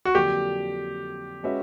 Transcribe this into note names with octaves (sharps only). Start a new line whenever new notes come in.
F#4
F2 D3 F#3 A#3 D4 G4
G#3 C#4 F#4 B4 E5